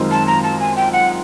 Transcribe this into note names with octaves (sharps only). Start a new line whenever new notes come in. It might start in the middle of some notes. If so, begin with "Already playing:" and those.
Already playing: F#2 D#3 G#3 C4 F4
A5
A#5
A5
G#5
G5
F#5